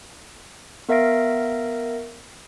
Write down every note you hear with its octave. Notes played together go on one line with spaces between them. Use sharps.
B3 A#4 E5 F5 A#6 D7